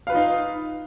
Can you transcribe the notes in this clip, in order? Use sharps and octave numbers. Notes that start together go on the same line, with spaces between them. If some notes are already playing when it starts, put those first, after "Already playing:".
D#4 F4 B4 F5